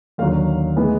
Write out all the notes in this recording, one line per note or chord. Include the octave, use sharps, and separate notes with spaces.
D#2 D3 F#3 F5
A2 E3 G#3 B3